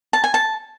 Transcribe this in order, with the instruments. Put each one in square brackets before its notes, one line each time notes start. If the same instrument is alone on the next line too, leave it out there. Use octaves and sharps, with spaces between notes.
[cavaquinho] A5
G#5
A5